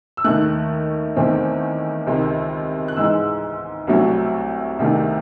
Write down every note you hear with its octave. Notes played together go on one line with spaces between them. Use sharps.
E6
D#2 D#3 A3 F#6
E2 D#3 A3 C4
C#2 C3 D#3
F#6
G#2 E3 G#3 E6
C2 C3 F#3 A3
C2 C3 D#3 A3